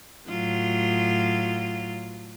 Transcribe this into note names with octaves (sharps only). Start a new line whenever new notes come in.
A2 F#3 F4